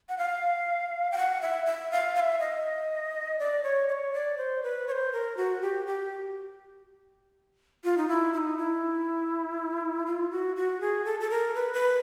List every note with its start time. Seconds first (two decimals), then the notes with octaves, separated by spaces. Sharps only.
0.09 F#5
0.18 F5
1.12 G5
1.17 F#5
1.41 E5
1.66 E5
1.92 F5
2.15 F5
2.20 E5
2.40 D#5
3.39 D5
3.64 C#5
3.89 D5
3.92 C#5
4.13 D5
4.38 C5
4.63 B4
4.88 C#5
4.92 C5
5.13 A#4
5.37 F#4
5.62 G4
5.87 G4
7.84 F4
7.98 D#4
8.09 E4
8.33 E4
8.38 D#4
8.58 E4
10.06 F4
10.31 F#4
10.56 F#4
10.81 G#4
11.05 A4
11.20 A4
11.30 A#4
11.55 B4
11.74 B4